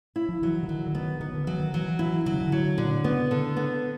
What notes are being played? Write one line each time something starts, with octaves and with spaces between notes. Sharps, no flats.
E4
F3
E3 F#3
D3
D#3 F#3
D3
D#3 B3
D#3 B3
D3
E3 F#3
D#3
E3 F#3
E3 E4
D3 F#3
C#3
D3
F#3
A#2 D3
C#3 B3
D3
B3